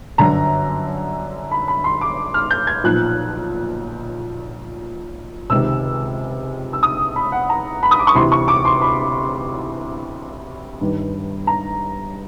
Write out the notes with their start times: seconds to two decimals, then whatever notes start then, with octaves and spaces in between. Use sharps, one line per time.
0.18 G1 F#2 D3 A#5
1.51 B5
1.68 B5
1.84 C6
2.01 D6
2.34 F6
2.51 G6
2.67 G#6
2.84 B1 A#2 F3 F#6
5.50 C#2 C3 D#3 E6
6.73 E6
6.83 D#6
7.16 B5
7.32 F#5
7.50 A#5
7.83 B5
7.91 D#6
7.99 D6
8.07 C#6
8.15 D2 C3 E3 C6
8.32 C#6
8.48 D6
8.65 C6
8.82 B5
10.81 G1 G2 D#3
11.47 A#5